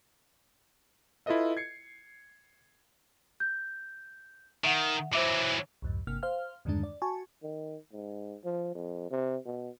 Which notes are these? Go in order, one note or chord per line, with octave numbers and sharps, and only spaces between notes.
E4 F4 A4 B4 D#5 E5
G#6 C7 C#7
G6
D#3 E5 F#5
E3 F#3 C5 E5 D6
C2 F2 G#2
G1 C3 A#3 F6
C5 F5 F6
E2 G2 D3 D#3 G#3 D4
D5
F#4 G#5 A5 C#6
D#3
G#2
F3
F2
C3
B2